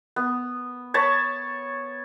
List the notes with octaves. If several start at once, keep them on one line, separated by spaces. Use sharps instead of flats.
B3
C#5 A5 B5 C#6